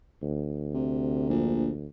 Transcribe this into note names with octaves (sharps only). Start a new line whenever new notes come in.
D2
C3
A#1